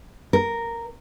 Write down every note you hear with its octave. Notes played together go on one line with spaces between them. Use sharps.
A#4